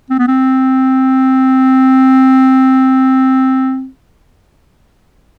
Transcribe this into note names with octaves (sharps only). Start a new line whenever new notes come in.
C4
B3
C4